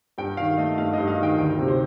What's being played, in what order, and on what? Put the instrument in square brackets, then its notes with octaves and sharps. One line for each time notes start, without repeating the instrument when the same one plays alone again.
[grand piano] G2 G5
D#3 F5
A3 D#5
G2 F5
G2 D#5
F5
D#3
G5
D2 G5
C3
C5